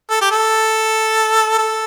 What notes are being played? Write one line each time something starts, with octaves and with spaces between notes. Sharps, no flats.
A4
G4
A4
A4